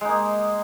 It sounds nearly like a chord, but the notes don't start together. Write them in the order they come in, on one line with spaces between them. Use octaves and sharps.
G#3 D#4 A#3